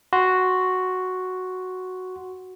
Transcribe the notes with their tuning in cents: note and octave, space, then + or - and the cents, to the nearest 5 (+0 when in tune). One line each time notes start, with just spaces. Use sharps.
F#4 +0 C6 +0